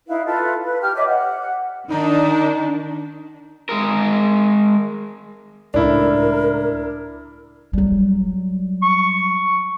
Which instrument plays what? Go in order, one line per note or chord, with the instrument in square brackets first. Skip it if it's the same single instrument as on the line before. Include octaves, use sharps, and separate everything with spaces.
[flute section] D#4 E4 B4 F5
F4 A4 B4
B4
G4 F6
C#5 D#5 E5 D6
F#5
[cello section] D#3 D4 [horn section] D#4
[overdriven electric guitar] G#3 A#4
[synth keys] C#2 A2 [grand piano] D4 E4 [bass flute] A#4
[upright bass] F#3 G3
[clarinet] C#6